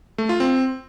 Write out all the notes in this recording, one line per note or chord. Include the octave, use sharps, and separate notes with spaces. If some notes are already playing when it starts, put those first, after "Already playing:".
A3
F4
C4